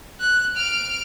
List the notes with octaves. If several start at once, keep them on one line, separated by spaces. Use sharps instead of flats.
F#6
F6 D7